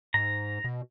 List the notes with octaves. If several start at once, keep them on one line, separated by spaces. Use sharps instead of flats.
G#2 A#5
B2